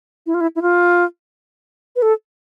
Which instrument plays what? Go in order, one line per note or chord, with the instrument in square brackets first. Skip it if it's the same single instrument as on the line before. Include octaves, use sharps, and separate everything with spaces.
[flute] E4
F4
E4
E4
F4
B4
A4